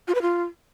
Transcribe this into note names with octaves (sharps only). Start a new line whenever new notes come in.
F4
B4
F4